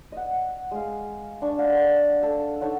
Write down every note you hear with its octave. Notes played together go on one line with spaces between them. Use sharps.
D#5 F#5
G#3 F5
D4 C#6
F5 F#5
A4
D#4 A4 C#5 F#5